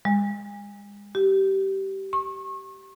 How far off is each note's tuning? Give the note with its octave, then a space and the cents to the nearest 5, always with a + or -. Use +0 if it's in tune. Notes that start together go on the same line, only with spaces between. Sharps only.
G#3 -35
G4 -20
C#6 -35